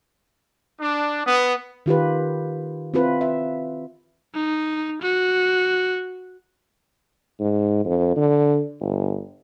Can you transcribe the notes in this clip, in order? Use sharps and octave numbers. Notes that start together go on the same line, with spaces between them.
D4
B3
D#3 F4 G4 B4
C4 E4 F4 B4
E5
D#4
F#4
G#2
F2
D3
G1